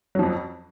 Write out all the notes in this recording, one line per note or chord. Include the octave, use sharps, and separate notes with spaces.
F2 F3 F#3